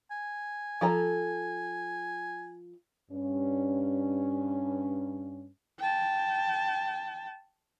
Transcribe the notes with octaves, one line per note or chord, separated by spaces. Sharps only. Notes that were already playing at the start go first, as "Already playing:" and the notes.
G#5
F3 A4 A#5
G2 C#4
G5 A5